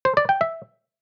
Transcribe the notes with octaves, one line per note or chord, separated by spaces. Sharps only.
C5
D5
G5
E5